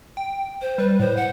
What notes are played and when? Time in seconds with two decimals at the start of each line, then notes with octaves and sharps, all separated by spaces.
0.17 G5
0.62 C5
0.78 G3 B4
1.00 A2 C5
1.17 F#5